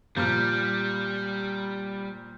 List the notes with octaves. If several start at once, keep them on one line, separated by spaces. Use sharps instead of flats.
A#2 F3 G3 A#3 F6 G6